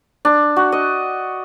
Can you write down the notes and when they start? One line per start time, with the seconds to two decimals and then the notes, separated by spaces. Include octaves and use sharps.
0.25 D4
0.56 F#4
0.72 D#5